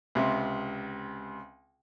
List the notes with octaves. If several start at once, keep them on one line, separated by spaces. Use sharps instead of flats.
C#2 C3